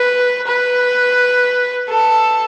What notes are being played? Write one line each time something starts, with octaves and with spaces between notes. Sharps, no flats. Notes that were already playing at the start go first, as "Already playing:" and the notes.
Already playing: B4
B4
A4